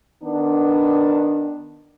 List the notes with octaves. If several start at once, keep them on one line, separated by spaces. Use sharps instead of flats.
D#3 B3 D4